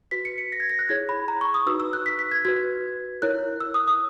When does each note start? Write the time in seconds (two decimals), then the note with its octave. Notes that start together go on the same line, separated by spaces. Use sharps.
0.11 F#4 B4 B6
0.25 C#7
0.38 C#7
0.52 A#6
0.60 G#6
0.70 A#6
0.79 F#6
0.89 E4 G#4 C#5 G#6
1.09 B5
1.28 A#5
1.41 C#6
1.54 D#6
1.66 D#4 F#4 B4 E6
1.80 E6
1.93 F#6
2.06 B6
2.19 B6
2.31 G#6
2.45 F#4 B4 G#6
3.22 E4 A#4 C#5 F#6
3.60 E6
3.74 D#6
3.88 D#6